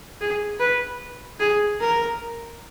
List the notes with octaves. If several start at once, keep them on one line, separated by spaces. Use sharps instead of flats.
G#4
B4
G#4
A#4